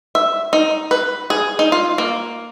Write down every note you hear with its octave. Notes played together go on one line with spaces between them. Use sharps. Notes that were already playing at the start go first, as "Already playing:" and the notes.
E5
D#4
B4
G#4
D#4
F4
A#3